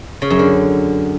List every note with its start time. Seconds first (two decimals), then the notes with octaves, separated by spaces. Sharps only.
0.22 C#3
0.30 F#2
0.39 D3